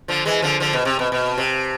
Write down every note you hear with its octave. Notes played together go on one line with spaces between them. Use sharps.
D3 F3
E3 G#3
D3 F3
D3 F3
B2
C3
B2
B2
C3